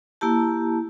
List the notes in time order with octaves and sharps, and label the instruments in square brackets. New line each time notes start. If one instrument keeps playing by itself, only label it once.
[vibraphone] A#3 E4 G4 A5